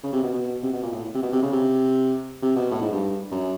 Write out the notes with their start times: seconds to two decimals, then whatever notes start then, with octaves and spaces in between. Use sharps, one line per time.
0.03 C#3
0.13 C3
0.23 B2
0.34 B2
0.63 C3
0.73 B2
0.83 A#2
0.92 A2
1.15 C3
1.23 B2
1.33 C3
1.43 C#3
1.53 C3
2.42 C3
2.56 B2
2.71 A2
2.82 G#2
2.92 G2
3.31 F#2